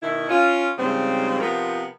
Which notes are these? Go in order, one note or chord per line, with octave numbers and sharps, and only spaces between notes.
B2 D#3 E4
C#4 F4
G#2 C#3 F3 G3 C4
C3 F3 B3 F4 A#4